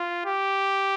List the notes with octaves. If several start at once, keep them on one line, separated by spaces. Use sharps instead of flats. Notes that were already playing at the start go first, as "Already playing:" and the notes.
Already playing: F4
G4